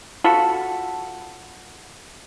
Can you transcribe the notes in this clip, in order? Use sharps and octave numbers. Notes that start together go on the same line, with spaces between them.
F4 F#4 A4 B5